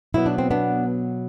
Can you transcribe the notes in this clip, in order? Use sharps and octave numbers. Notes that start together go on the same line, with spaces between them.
B2 F#3 B3 E4
D4
C4
B3 D4